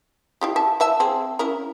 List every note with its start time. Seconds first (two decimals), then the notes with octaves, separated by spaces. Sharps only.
0.41 E4 F4 G4
0.56 E5 A5
0.80 E3 E5 A5
1.00 C4 G#4
1.39 C#4 E4 A#4